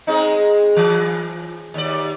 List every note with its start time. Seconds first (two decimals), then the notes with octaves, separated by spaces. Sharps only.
0.07 G#3 C4 D#4
0.77 E3
1.74 D#2 D5